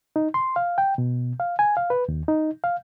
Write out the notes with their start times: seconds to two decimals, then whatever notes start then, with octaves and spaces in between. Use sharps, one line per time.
0.16 D#4
0.34 C6
0.56 F5
0.78 G5
0.98 B2
1.40 F5
1.59 G#5
1.77 F5
1.90 B4
2.09 D#2
2.28 D#4
2.64 F5